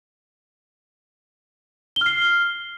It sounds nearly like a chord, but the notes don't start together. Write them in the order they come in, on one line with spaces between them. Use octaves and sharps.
G7 F6 C7